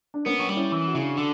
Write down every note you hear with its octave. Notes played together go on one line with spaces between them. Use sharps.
D4
A#3 B3 C#4
F#3
G3
C#4 E4
E3
F#4
C#3 E4
D4 F#4
D3